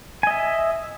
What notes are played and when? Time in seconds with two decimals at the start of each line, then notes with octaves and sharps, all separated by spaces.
0.23 G#5
0.27 D#5
0.31 E5